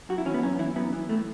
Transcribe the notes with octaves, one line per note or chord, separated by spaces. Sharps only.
F#2 F#4
E4
E3 C#4
B3
F#2 C#4
E3 E4
F#2 B3
E3
A2 A3